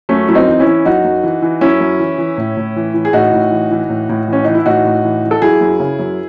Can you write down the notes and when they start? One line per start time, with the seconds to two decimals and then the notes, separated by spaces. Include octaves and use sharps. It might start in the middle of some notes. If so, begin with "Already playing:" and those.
0.09 F#2 A3 C#4
0.28 F#2 E4
0.35 C4 D#4
0.48 E3
0.60 C#4 E4
0.66 E3
0.85 F#2 D#4 F#4
1.04 F#2
1.24 E3
1.42 E3
1.61 F#2 C#4 E4
1.80 F#2
2.00 E3
2.18 E3
2.38 A2
2.57 A2
2.76 E3
2.94 E3
3.05 G#4
3.13 A2 D#4 F#4
3.33 A2
3.51 E3
3.71 E3
3.89 A2
4.09 A2
4.28 E3 C#4
4.44 E3 D#4
4.55 E4
4.66 A2 D#4 F#4
4.85 A2
5.04 E3
5.23 E3
5.31 A4
5.42 F#3 E4 G#4
5.61 F#2
5.80 C#3
5.99 F#2